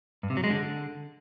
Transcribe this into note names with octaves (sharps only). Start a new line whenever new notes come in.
G2
C3
F#3
G#3
D3